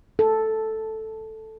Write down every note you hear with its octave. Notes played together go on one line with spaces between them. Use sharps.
A4